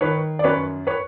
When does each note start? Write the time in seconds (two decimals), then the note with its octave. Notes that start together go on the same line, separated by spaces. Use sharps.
0.01 D#3 B4 C#5
0.39 D5
0.44 F#2 B4 C#5
0.87 B4 C#5